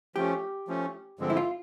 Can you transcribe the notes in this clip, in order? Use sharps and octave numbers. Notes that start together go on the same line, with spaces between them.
F3 A3 C#4 G4
F3 A3 C#4
G2 D3 F3 G#3 C4
E4
F4